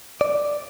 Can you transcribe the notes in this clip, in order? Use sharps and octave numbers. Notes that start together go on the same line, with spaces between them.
D5